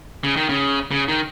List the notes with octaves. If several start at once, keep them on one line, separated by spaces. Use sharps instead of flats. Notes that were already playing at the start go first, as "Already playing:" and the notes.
C#3
D#3
C#3
C#3
D#3